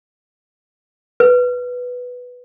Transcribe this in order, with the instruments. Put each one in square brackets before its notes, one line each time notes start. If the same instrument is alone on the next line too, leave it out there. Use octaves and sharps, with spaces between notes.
[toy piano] B4